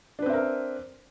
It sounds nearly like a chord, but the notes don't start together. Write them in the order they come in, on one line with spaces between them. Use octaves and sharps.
D4 B4 C4 E5 A#4